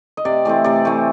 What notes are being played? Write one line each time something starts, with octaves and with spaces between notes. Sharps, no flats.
D#5
C3 D5
E3 A3 C4 D5
C3 D5
E3 A3 C4